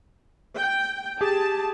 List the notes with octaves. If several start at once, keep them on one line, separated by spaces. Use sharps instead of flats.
G5
G4 G#4 A5